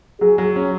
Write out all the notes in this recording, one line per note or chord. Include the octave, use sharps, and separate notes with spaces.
F#3 G#4
F#3
C#4